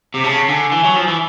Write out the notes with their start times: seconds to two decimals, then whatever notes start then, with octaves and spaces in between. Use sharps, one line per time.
0.14 C3
0.24 C#3 A5
0.48 D3 G#5
0.72 E3
0.84 F#3
0.96 F3
1.08 E3